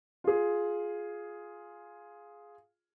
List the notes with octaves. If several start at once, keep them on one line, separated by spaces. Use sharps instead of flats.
F4 G#4